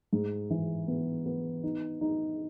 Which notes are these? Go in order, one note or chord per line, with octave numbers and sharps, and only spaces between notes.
G#2
E3
B3
B3
D#4
D#4